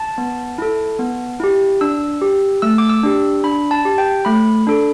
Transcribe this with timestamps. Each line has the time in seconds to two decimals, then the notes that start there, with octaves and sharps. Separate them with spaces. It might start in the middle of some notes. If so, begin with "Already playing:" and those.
Already playing: A5
0.18 B3
0.58 E4 A4
0.99 B3
1.40 E4 G4
1.81 D4 E6
2.21 G4
2.62 A3 E6
2.78 D6
2.90 E6
3.03 D4 G4
3.44 D4 B5
3.71 A5
3.85 G4
3.98 G5
4.25 A3 B5
4.67 D4 A4